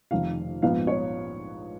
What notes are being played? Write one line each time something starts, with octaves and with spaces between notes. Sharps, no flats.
F1 F2 D#3 F5
A#1 G#2 F3 B3 D#4 F5
C#5